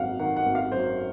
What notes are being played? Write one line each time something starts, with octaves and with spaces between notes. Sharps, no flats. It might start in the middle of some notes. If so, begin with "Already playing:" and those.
Already playing: G#1 F#2 F5 F#5
D#3 F#5
F#5
G#1
F5
F#2 C5